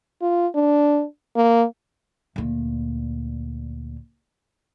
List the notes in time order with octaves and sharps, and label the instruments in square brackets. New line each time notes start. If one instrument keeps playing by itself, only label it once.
[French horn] F4
D4
A#3
[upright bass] D2 A#2